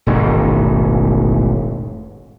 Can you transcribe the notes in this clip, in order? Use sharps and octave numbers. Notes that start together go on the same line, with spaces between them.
E1 A1 G#2 D#3